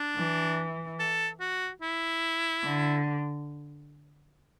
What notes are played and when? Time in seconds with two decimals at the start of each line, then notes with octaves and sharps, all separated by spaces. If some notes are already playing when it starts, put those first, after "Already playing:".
Already playing: D4
0.16 E3
0.99 A4
1.40 F#4
1.82 E4
2.64 D3